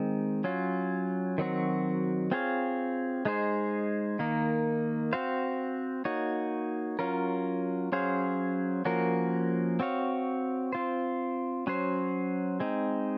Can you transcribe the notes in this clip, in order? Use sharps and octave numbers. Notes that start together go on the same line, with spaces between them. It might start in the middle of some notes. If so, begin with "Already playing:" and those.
Already playing: D#3 G#3 C4
F#3 C#4 F4
D#3 F#3 C4 F#4
C4 F4 G#4 C#5 F5
G#3 D#4 G#4 C5
D#3 A#3 D#4
C4 F#4 C5 F5
A#3 D#4 F#4 C#5
F#3 C#4 F4 A#4
F#3 C#4 G#4 C5 F5
F3 A#3 C#4 F#4 A#4
C4 F#4 C#5 F5
C4 F4 C5
F#3 C#4 F#4 C5
G#3 C4 D#4